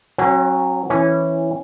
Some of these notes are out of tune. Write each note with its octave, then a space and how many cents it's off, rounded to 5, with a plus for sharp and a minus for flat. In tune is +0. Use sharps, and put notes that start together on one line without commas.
F#3 +0 C#4 -40
E3 +0 C#4 -15